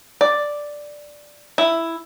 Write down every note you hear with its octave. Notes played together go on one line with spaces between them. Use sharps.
D5
E4